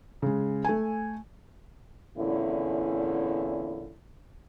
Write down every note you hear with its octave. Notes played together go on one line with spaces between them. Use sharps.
C#3 G#3
A3 G#5
E2 A#2 D3 C#4 E4